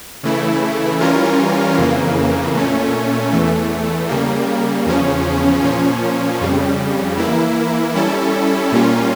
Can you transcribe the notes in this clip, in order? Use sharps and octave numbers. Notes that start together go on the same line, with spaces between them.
C#3 E3 A3 E4
E3 G3 C#4 F4 A#4
F2 C#3 E3 A#3
A#2 A3 C#4
E2 E3 A3
C#3 G3 A#3
E2 C#3 F3 C#4
A#2 F3 C#4
F2 C#3 G3
E3 A#3 E4
G3 C#4 E4 A4
A#2 G3 A#3 C#4 F4